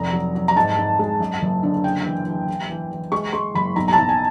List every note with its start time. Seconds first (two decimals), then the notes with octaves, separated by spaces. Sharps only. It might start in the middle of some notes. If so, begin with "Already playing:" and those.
Already playing: F1 A#5
0.13 F#3
0.35 F#3
0.48 A#5
0.56 G#2 A5
0.77 G#2
0.99 G#3
1.20 F#2
1.41 F#1
1.63 D3
1.83 C#3 G5
2.05 E3
2.27 E3
2.48 E3
2.69 E3
2.91 E3
3.12 G#3 C#6
3.33 G#3 C6
3.54 F#1 B5
3.76 B1 A#5
3.88 A#5
3.93 A5
3.98 B1
4.09 G#5